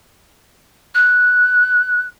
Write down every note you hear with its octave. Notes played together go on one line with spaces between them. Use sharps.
F#6